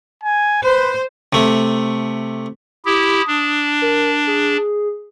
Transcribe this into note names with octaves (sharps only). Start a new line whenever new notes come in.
G#5
B4 C5
C3 A3
E4 G4 D#6
D4
A#4
G#4